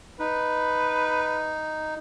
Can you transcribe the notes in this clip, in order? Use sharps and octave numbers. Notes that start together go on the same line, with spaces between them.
D#4 B4